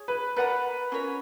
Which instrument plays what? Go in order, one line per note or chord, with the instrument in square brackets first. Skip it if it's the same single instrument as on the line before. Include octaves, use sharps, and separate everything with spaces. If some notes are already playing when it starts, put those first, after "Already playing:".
Already playing: [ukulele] G#4 C#5
[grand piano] B4
[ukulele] A#4 D5 F#5 A#5 [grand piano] B4
[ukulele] C#4 F4 A#4 C#5